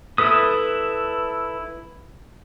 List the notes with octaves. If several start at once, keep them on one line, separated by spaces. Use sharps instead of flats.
E4 A4 B4 D#6